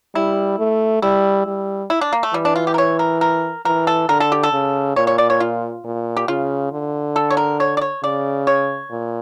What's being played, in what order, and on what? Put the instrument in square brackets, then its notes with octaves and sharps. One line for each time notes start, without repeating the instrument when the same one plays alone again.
[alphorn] G3 [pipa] E4
[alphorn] A3
[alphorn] G3 [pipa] E4
[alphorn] G3
[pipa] E4
D4
A#3
A3
[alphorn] E3 [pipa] G3
[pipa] D4
F4
G4
A#4
C#5
A#4
A#4
[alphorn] E3 [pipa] A#4
[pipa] A4
[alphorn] D3 [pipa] A#4
[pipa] A4
G4
A4
[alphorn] C#3
[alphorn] A#2 [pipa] C#5
[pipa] C#5
D5
C#5
F4
[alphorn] A#2
[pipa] G4
[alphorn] C#3 [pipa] F4
[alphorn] D3
[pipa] A4
C#5
A#4
C#5
D5
C#5
[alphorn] C#3 [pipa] D5
[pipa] C#5
[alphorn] A#2